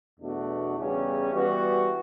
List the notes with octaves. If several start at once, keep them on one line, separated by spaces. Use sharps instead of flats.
E2 B2 A3 D4 F#4
E2 C#3 G3 C#4
E3 G3 B3 F#4